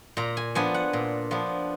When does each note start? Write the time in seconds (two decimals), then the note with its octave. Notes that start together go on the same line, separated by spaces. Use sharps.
0.17 A#2 A#5
0.37 G#5
0.55 F3 B3 D4 G#5
0.74 F#5
0.93 A#2
1.31 F3 B3 D4